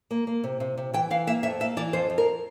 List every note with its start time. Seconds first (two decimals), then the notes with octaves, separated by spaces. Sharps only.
0.11 A#3
0.27 A#3
0.44 C3
0.60 C3
0.77 C3
0.93 E3 G5
1.10 E3 F5
1.27 A#3 E5
1.43 F2 E5
1.60 A#3 E5
1.77 E3 D5
1.93 F2 C5
2.10 F2
2.18 A#4